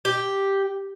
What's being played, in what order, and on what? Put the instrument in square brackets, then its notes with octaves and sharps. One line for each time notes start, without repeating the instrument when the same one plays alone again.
[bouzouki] G4